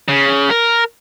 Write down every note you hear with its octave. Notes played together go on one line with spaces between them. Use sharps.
C#3
A#4